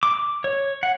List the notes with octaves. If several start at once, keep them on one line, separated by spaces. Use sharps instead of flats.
D6
C#5
F#5